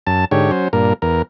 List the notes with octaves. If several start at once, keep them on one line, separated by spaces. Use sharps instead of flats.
F#2 A5
G#2 D3 G4 C#5
F#3 C#4 C5
G2 A#2 A#4
E2 A#4